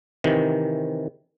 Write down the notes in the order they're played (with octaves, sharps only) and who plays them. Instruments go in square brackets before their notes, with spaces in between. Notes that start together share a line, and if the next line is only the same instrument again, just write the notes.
[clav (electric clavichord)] C3 D#3 E3